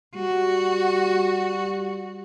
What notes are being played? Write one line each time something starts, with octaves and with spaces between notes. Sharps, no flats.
G3 F#4